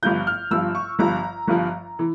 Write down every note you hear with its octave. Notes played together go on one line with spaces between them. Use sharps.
G1 G2 F3 G6
F6
G1 G2 F3 E6
C#6
G1 G2 F3 A#5
G1 G2 F3
E3